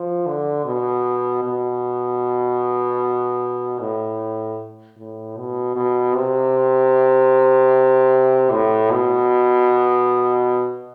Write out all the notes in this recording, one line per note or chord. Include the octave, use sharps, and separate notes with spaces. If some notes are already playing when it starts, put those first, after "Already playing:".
Already playing: F3
D3
B2
B2
A2
A2
B2
B2
C3
A2
B2